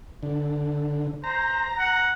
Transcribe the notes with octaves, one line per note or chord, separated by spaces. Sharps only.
D3
C5 A#5
F#5